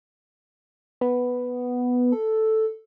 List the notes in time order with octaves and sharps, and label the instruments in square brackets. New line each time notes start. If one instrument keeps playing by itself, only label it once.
[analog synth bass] B3
[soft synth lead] A4